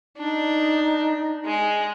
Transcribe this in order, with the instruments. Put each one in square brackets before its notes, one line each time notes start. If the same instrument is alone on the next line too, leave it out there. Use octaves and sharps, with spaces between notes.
[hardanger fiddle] D4 [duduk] D#4
[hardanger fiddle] G#3 G#4